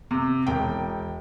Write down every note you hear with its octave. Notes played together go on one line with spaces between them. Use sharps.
C3
E1 G5